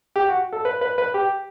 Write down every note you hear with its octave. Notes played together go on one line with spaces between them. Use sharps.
G4
F#4
A4
B4
B4
B4
G4